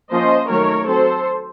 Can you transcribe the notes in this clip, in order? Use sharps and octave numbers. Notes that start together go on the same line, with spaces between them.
F3 A#3 C#4 C5 D#5
D#3 F#3 A3 A#4 C#5
F#3 C4 A4 C5